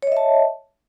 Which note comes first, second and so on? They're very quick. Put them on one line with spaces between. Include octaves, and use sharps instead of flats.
C#5 D#5 E5 A5